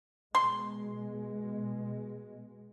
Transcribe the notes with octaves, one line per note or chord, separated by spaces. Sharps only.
B2 G#3 C6